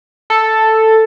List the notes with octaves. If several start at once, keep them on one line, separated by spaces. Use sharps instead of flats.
A4